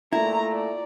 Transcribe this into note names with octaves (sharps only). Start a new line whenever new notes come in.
A#2 A3 E4 A#5
D5